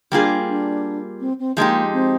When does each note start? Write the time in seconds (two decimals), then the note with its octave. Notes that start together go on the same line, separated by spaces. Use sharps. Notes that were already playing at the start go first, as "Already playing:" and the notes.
0.12 G3 A#3 D4 F4 G#4
0.48 D4
1.20 C4
1.39 C4
1.57 F3 G#3 A#3 D#4 G4
1.93 C4